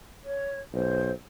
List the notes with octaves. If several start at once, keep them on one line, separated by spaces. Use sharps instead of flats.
C#5
B1 C5